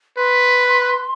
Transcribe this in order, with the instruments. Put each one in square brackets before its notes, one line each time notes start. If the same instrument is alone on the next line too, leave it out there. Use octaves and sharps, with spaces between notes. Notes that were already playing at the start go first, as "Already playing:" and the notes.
[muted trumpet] B4 [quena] C6